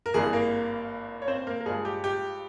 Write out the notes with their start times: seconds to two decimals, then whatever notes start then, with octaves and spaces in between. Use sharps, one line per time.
0.06 A#4
0.14 G#1 G2 E3 A#3 G#4
0.33 A#3 A#4
1.22 C#5
1.28 C4 C5
1.47 A#3 A#4
1.61 A#4
1.66 G2 F3 G#3 G#4
1.85 G4
2.04 G4